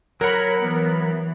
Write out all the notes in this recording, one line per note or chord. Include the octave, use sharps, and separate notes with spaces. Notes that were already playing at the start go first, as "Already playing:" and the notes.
F#3 A#4 C#5 F#5 B5
E3 B3